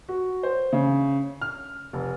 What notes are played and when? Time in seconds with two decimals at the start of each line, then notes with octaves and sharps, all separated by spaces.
0.09 F#4
0.43 C5
0.73 C#3
1.42 F6
1.93 F1